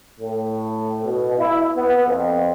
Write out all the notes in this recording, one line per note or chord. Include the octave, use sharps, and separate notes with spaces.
A2
B2
E4
B3
F2